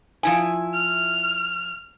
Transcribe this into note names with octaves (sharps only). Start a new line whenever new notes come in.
F3 E4 G#5
F6